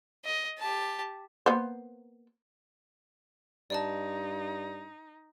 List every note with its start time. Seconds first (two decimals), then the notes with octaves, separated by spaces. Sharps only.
0.25 D#5
0.59 G4 A5
1.46 A#3 B3 C5
3.70 G2 D#4 D5 D#5 A5